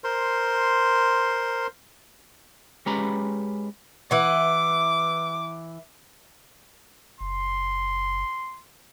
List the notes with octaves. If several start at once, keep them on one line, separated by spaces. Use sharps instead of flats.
A#4 C5 C6
G#3 C#4 G4 B4 A#5 B5
E3 F#5 D6
F#1 C6